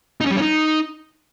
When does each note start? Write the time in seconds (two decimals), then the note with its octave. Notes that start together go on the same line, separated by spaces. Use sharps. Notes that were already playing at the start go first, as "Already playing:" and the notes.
0.21 D#4
0.26 C#4
0.31 G3
0.36 C#4
0.42 D#4